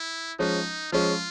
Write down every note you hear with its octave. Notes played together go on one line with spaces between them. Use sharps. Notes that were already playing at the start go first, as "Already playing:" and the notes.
Already playing: E4
F3 G#3 C#4 D#4
F3 G#3 C#4 F4